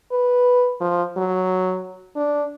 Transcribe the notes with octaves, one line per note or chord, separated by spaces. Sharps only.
B4
F3
F#3
D4